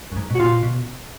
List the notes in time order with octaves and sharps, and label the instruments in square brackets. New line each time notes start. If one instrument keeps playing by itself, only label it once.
[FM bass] F#2
G#2
[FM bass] B2 [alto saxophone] F#4
[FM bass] A#2 [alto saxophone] F4
[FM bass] B2